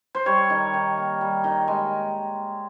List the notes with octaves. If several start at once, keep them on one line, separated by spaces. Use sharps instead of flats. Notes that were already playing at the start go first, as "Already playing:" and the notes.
C5
G3 C#5
D#3
D#3
A#3
G3
D#3
G#3